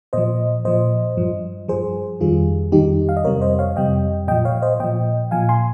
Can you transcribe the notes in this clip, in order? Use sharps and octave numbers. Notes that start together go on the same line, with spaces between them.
A#2 F3 C5 D#5
A#2 F3 C5 D#5
G2 F3
G2 F3 G#4 C5
F2 D#3 G3 F4 G#4
F2 D#3 G3 D#4 G4
F5
D#5
F2 C3 G3 A#4 C#5
C5 D#5
C#5 F5
F2 C3 G3 D#5 G5
A#2 F3 D#5 G5
C#5 F5
C5 D#5
A#2 F3 D#5 G5
A#2 F3 F5 G#5
G#5 C6